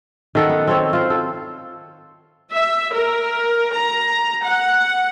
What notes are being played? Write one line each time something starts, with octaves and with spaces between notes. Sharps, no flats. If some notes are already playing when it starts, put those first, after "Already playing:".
D#3 A4 F#5
B3
C4 A4 C#5
F4 C5
A4
E5
A#4
A#5
F#5